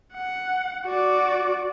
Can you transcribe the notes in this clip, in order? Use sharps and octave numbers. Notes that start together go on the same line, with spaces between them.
F#5
F#4 D5